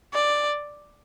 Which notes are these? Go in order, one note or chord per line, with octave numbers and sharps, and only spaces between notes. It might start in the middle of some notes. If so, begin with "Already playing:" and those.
D5